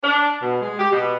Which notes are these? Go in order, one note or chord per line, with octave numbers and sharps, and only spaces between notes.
D4
B2
G#3
G4
B2